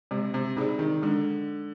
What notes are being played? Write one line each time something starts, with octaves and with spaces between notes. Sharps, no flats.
C3 G#3
C3
C3 D#4 G#4 D5
D#3
D3 G#3